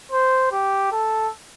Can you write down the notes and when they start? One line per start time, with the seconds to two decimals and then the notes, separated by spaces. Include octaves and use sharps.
0.12 C5
0.52 G4
0.92 A4